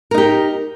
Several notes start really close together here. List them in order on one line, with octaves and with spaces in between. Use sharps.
A#4 D#4 G4